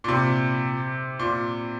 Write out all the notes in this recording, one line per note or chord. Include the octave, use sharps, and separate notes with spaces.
A#2
C3
A#2